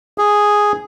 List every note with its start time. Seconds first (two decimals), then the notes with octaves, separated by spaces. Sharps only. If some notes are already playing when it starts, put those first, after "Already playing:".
0.18 G#4